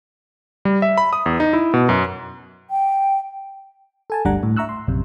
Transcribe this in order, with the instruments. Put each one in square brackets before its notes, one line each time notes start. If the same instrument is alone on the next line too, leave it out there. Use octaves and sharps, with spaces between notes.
[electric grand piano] G3
E5
B5
D#6
E2
D#4
E4
B2
F#2
[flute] G5
[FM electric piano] A4 G#5 A5
G1 D2 G3 D4 F#5 A#5
A2
E5 A#5 C#6 E6 F#6
C6
A#1 F#2 C3